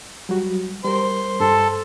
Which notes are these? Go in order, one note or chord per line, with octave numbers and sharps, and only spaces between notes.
F#3 G3 F#4
G3 A#4 C5
G2 A4